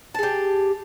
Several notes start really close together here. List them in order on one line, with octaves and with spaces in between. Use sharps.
A5 G#4 G4